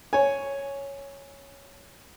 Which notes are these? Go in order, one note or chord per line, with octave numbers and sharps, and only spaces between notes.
C#5 G#5